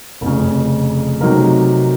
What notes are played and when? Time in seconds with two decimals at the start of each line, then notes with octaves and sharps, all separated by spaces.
0.21 F1 F2 C#3
1.21 C3 F#3 A3 D#4 A#4